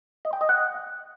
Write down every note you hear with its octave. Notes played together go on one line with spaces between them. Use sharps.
D#5
G5
D#5
F#5